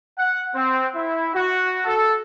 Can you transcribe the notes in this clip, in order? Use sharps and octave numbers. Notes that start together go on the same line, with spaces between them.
F#5
C4
E4
F#4
A4